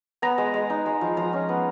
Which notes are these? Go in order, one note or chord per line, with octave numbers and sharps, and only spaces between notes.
B3 A#5
G#3
G#3
D#4
G#3
F3
F3 A#5
C#4
B3